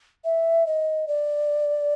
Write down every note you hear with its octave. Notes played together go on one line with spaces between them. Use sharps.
E5
D#5
D5